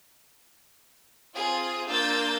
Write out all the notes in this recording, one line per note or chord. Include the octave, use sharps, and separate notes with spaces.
C4 F4 G#4
A#3 D4 F4 E6 G6 A6